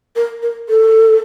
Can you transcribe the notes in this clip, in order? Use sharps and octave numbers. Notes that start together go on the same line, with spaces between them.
A#4
A#4
A4